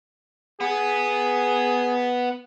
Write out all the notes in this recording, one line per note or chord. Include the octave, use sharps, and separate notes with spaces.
B3 G#4